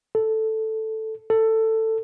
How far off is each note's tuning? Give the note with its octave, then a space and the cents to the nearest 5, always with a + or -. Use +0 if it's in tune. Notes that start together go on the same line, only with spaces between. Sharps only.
A4 +0
A4 +15